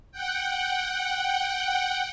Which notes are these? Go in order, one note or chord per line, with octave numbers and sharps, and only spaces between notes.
F#5 G5